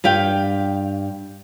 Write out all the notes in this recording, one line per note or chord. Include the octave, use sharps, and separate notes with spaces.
G2 G4 F5 G5